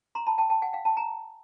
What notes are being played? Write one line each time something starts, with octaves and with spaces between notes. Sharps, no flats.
A#5 C6
A5 B5
G5 A5
G5 A5
F#5 G#5
F5 G5
G5 A5
G#5 A#5